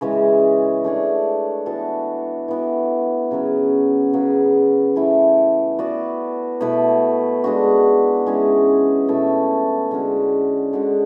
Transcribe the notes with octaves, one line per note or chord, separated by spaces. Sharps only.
C#3 E3 G#3 C#4
A3 D4 G#4
E3 B3 F#4 A4
E3 B3 F#4
C#3 F#3 C#4 F#4
C#3 F#3 B3 F#4
E3 A3 E4
B3 F#4 B4 D5
B2 A3 E4 B4
G#3 D4 F#4
E3 G#3 C#4
B2 A3 E4 A4
D3 G#3 C#4 F#4
D3 G#3 D4 F#4